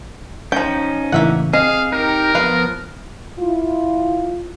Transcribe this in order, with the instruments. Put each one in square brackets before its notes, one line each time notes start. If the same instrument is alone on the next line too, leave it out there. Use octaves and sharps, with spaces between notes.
[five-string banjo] F3 G5 [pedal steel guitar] C#4 D#4
[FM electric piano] A2 C#3 E3 [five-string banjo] A#3 E5 F#5
[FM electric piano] C4 [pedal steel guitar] G#4 [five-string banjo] D#5 [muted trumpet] F5
[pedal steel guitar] D#4 G4 [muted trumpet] A#4
[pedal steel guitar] F3 B3 [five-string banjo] B4 F5
[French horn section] E4 F4